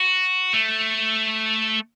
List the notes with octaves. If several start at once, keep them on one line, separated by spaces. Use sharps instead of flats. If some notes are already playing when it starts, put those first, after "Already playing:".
Already playing: F#4
A3